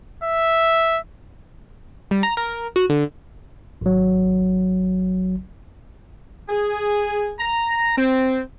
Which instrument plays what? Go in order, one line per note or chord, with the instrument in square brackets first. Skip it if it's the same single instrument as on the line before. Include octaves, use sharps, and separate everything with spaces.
[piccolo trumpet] E5
[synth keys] G3
A#5
A#4
F#4
D3
[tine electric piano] G#1 F#3
[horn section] G#4
A#5
C4